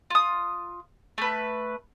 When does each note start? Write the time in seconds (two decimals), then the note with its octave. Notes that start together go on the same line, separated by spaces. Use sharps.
0.10 F4 D#6
1.18 A3 B4